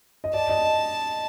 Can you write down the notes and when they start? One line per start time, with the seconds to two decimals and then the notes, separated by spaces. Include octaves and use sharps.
0.24 D#5
0.33 D5 A5
0.50 D#5